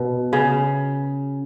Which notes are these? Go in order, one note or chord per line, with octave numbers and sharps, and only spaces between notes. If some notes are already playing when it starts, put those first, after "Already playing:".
Already playing: B2
C#3